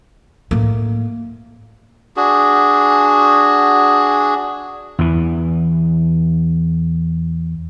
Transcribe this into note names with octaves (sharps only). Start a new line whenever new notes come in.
A2 A#3
D4 F#4 G#4
E2 E3